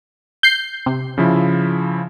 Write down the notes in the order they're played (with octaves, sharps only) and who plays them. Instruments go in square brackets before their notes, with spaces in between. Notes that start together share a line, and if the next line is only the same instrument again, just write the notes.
[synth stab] G6 C7
C3
[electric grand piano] C#3 F3 E4